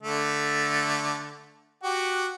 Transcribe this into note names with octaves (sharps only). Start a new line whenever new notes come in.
D3 A3
F#4 G4